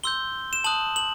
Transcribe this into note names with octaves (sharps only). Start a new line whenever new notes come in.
C6 E6 G6 G7
E7
A5 D#6 F#6 F#7
F#7